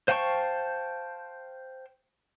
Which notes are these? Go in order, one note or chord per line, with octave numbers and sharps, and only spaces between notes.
C5 F5 G5 A5 C#6